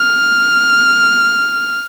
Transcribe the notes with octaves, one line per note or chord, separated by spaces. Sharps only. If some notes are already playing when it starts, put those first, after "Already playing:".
Already playing: F6